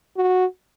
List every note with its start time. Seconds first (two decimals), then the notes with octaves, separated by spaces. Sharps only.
0.17 F#4